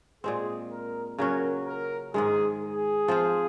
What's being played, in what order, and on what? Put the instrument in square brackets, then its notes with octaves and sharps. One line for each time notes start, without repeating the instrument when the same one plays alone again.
[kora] A#2 G#3 C4 [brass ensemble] G#4
[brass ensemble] A#4
[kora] C#3 F#3 C#4 F#4 [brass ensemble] A#4
[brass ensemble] A#4
[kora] G#2 D#3 G#3 [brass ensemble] G#4
[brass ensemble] G#4
[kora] F3 C4 F4 C5